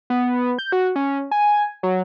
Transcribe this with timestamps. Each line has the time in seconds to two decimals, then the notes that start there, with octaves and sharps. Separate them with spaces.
0.10 B3
0.59 G6
0.72 F#4
0.96 C#4
1.31 G#5
1.83 F#3